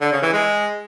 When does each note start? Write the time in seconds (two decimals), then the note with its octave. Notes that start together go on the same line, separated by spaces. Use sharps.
0.01 D3
0.12 C#3
0.23 E3
0.33 G#3